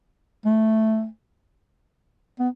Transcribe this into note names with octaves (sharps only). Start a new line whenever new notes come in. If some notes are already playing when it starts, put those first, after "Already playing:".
A3
B3